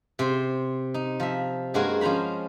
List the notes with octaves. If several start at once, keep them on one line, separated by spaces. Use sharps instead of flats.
C3 C5
D#4
F3 E5
G2 G#3 A#3 F#4 A#4 G#5
F3 C#4 C5 A#5 B5